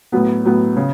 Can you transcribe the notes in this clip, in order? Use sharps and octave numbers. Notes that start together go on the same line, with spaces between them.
A2 F#3 B3
A2 F#3 B3
C#3